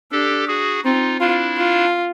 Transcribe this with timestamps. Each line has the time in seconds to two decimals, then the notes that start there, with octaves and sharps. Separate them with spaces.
0.12 D4 G4 A4
0.48 F#4 G#4
0.84 C4 D#4 F4
1.20 D4 E4 F4
1.57 F4